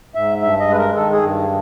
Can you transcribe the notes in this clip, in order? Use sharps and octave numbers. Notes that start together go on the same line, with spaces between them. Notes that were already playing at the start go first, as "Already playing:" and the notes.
G#2 E5
G2 E5
D#5
G#3 B4
A#4
D#3 A4
G#4
G2